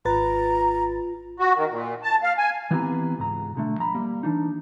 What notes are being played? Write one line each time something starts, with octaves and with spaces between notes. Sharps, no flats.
G#1 F4 B4 A#5 A6
F#4
D#3
A#2
A5
F5
G#5
E3 B3 C4 E4 G4 A#5
C#2 G#2 A#5
B1 D3 A3
F3 A#5 B5
G3 A#3
E3 D4 D#4